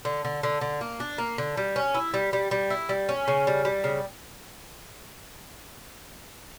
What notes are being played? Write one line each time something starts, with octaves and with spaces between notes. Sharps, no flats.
D3
D3
D3
D3
A#3
D4
A#3
D3
G3
C#4
E4
G3
G3
G3
E4
G3
C#4
C#3
G3
G3
C#3